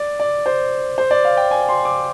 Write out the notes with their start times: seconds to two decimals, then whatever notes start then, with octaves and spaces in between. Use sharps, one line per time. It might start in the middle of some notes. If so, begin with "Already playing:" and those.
Already playing: D5
0.20 D5
0.46 C5
0.98 C5
1.11 D5
1.25 F5
1.37 G5
1.51 G#5
1.69 C6
1.85 D6